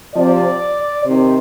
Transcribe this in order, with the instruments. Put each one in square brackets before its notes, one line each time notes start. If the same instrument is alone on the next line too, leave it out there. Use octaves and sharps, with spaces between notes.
[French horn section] C3 F3 D5
C3 D#3 C5